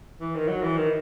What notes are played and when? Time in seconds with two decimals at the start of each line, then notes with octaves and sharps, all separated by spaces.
0.20 E3
0.34 D#3
0.48 F#3
0.63 E3
0.77 D#3